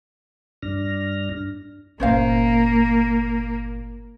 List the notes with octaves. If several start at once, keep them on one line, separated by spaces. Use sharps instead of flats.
G2 D4 F6 A#6
G1 A#2 A#3 C#4 C5 F5